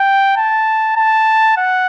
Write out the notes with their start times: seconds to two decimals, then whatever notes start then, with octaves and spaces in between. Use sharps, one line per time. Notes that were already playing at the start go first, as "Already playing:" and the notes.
Already playing: G5
0.37 A5
0.96 A5
1.57 F#5